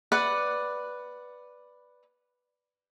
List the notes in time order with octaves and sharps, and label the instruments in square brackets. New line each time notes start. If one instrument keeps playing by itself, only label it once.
[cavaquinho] B4 D5 F#5